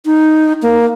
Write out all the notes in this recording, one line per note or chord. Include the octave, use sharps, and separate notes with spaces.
D#4
A#3